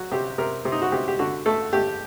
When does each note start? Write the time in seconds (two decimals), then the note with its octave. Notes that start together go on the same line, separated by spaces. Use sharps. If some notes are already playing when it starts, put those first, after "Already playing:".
Already playing: F#3 F#4
0.11 C3 G4
0.38 C3 A#4
0.65 C3
0.72 D#4
0.82 F#4
0.92 C3 G4
1.08 G4
1.19 D3 F#4
1.46 A3 A4
1.73 A3 G4